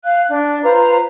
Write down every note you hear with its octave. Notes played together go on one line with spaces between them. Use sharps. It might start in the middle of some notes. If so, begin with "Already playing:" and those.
F5 F#6
D4
F4 B4 C5 A#5